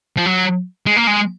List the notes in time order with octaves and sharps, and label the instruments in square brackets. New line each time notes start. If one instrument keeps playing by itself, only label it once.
[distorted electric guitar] F3
F#3
G#3
A#3
G#3